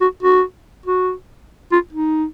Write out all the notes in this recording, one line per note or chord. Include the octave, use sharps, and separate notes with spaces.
F#4
F#4
F#4
F4
D#4